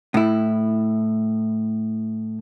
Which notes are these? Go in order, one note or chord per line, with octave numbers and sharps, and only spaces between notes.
A2 E4